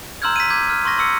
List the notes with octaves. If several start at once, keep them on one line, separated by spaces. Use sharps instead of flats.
A#5 C6 E6 F6 G6 G#6
B6 D#7
D6 G6 G#6
F6
C6 C#6 A#6
C6 E6 C#7